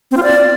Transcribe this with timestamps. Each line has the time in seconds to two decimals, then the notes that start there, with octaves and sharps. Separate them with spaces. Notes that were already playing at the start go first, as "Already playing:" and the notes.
0.11 C4
0.17 F4
0.23 D5